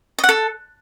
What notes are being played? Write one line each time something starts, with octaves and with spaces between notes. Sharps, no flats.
D#5
F#5
A4